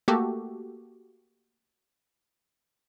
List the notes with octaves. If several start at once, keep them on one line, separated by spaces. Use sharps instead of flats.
A3 A#3 F#4 G4 A4